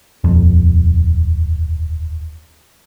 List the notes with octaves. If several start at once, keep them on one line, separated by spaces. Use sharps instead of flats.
D#1 F2